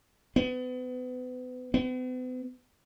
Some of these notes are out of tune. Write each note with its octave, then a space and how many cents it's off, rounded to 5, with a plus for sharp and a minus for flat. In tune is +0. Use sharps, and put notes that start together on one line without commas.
B3 +35
B3 +45